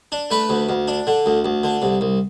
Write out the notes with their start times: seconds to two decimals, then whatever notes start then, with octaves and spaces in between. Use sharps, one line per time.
0.12 D4
0.31 A3 B4
0.49 D2
0.69 D2
0.88 D4
1.07 D3
1.26 D2
1.45 D2
1.64 D3
1.82 C2
2.01 C2